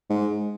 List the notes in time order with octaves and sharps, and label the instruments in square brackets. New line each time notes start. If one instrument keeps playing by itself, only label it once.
[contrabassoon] G#2